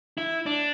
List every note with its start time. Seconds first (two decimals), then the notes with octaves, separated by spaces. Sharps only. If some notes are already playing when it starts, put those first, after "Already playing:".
0.18 E4
0.46 D4